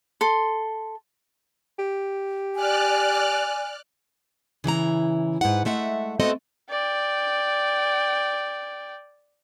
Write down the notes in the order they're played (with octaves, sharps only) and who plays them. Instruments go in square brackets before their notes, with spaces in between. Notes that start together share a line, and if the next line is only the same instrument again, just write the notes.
[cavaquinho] A4 C6
[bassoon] G4
[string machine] D5 F6 F#6 [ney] G#5
[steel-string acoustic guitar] C#3 E3 E4 A#5
G#2 B4 F#5
G#3 A3 E5 F#5
A3 B3 C4 F#4 A4 D#5
[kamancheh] D5 G5